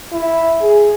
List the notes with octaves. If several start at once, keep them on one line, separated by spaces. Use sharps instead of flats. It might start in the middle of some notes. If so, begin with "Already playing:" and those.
E4
G#4